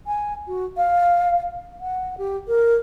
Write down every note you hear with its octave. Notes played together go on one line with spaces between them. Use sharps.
G#5
F#4
F5
F#5
G4
A#4